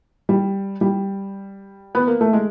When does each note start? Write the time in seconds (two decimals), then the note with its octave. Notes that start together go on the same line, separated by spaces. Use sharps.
0.29 G3
0.81 G3
1.95 B3
2.07 A#3
2.21 A3
2.33 G#3